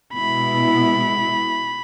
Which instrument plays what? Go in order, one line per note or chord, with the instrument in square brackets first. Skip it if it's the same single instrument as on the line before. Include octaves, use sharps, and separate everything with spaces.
[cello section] B2 G#3 B3 E4 [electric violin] B5